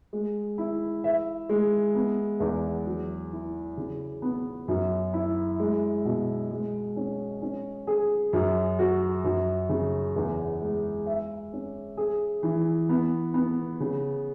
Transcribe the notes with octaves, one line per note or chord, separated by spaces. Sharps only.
G#3
E4
E5
G#3
B3
E2
F#3
E4
C#3
B3
F#2
E4
G#3
B2
G#3
C#4
C#4
G#4
F#2
F#4
F#2
C#3
E2
G#3
E5
C#4
G#4
E3
B3
B3
C#3